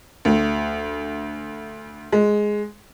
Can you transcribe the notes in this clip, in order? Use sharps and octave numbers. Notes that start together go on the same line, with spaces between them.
D2
G#3